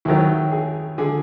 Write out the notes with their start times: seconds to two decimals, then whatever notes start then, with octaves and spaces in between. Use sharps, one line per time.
0.05 D#2 D#3 F#3 E4
0.52 G#4
0.98 D3 G#4